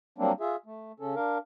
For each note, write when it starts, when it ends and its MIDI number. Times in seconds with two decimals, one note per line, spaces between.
0.18 0.32 54
0.18 0.32 55
0.18 0.32 58
0.18 0.32 60
0.18 0.32 62
0.40 0.56 65
0.40 0.56 68
0.40 0.56 76
0.66 0.92 57
1.00 1.15 49
1.00 1.15 61
1.00 1.15 69
1.15 1.38 62
1.15 1.38 70
1.15 1.38 77